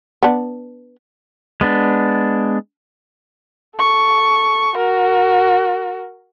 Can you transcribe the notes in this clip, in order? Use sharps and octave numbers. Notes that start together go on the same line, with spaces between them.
B3 D4
G#3 B3 D4
A4 C#6
F#4 A#4